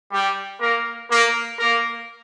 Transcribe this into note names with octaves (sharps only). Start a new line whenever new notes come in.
G3 G4
A#3 A#4
A#3 A#4
A#3 A#4